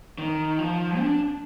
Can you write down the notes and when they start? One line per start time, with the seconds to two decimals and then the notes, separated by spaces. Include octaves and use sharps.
0.18 D#3
0.59 F3
0.99 D4